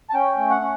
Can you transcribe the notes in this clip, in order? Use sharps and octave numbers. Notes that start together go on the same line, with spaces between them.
A5
C#4 G5
A3
F#5
C#4